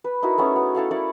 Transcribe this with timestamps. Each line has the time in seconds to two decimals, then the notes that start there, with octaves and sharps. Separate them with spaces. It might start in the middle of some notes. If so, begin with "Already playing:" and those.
0.04 B4
0.22 D#4 E4 F#4 A#4
0.38 A3 B3 C#4 G#4
0.56 B3
0.75 E4 A4 F5 F#5
0.91 E4 A#4 C#5 D5